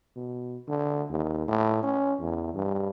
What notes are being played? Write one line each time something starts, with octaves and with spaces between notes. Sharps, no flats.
B2
D3
D#2
A2
C#4
E2
G2